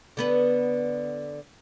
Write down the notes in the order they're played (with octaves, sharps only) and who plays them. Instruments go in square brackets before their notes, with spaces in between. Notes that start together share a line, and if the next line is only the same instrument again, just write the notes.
[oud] D3 B3 B4